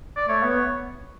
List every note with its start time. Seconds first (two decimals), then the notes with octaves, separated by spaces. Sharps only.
0.16 D5
0.27 A3 C#5
0.43 B3
0.50 C#5